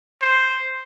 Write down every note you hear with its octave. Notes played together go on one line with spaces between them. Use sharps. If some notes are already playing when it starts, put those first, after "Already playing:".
C5